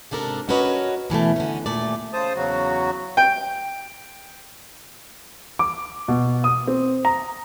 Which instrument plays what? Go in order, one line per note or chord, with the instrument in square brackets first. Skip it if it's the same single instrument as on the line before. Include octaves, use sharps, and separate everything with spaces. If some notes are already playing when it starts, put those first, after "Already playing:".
[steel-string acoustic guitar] G#2 C3 D4 A4 A#4
C#4 F#4 A#4 B4 C#5 D#5
B2 E3 G#3 A3
D3 C#4
D#2 A#2 A3 D5
[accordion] C#3 C5 A5 D#6
E2 C#3 F#3 F#4
[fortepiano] G5
[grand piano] D6
B2
D#6
C4
A#5